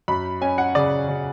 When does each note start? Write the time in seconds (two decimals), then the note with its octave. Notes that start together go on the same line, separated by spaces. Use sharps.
0.08 F#2 B5
0.41 C#4 G#5
0.58 F#5
0.75 C#3 D5
1.08 C#3